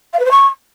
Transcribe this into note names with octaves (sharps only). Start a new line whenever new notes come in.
F5
B4
C5
C#6